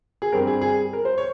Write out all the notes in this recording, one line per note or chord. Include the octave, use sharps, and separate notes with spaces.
G#4
G2 G3 C4 A#4
G#4
G#4
A#4
C5
C#5